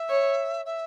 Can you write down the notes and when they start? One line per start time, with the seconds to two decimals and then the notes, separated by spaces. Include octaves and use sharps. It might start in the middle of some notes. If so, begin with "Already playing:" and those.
Already playing: E5
0.10 C#5
0.65 E5